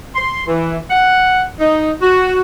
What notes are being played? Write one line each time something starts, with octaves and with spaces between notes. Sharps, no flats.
C6
E3
F#5
D#4
F#4